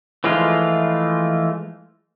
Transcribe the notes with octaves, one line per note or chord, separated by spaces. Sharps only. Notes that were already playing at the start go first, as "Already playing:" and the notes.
E3 F3 G#3 A3 F4